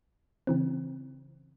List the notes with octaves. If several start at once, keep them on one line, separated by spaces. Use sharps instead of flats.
C#3 E3 C4